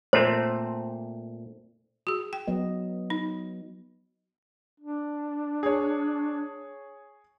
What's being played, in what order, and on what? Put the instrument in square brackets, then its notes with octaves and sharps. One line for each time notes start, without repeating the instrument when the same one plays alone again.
[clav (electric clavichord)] A#2 A3 C4 [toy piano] C5
[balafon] F#4 G#4
G5
[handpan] F#3 B3 D#5
[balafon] D#4
[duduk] D4
[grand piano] G#4 C#5